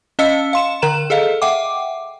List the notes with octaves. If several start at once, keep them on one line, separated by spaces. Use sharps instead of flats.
C#4 D#5 F5 E6 C#7
F5 C6 E7
D3 A#4 A#5 E7
G#4 A4 D#5 F5
E5 F#5 G5 D6